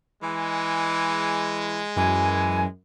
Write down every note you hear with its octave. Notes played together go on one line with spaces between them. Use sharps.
E3 G#3
F#2 E3 G#5